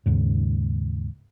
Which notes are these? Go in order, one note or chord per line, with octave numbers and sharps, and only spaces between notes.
D#2 G#2 C#3